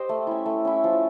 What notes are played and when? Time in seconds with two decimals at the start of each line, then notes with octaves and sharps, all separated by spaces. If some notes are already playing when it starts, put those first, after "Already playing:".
Already playing: G4 C5 D#5
0.09 A3
0.27 C#4 E4
0.46 A3
0.65 C#4 E4
0.84 F3